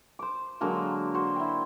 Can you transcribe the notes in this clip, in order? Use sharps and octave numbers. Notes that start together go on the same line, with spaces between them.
C5 D6
D3 F#3 G#3 A#3
F#4 C5
E4 G5